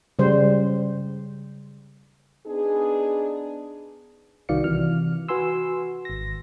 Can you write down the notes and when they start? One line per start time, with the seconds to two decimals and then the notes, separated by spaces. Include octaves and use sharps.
0.19 C#3 G3 C5
2.47 B3 D4 D#4 G#4
4.49 C2 D#3 F#4 D5 F5 C#7
4.64 C3 E3 F6
5.28 F#4 B4 G#5 C6 E6
6.05 G#1 A#6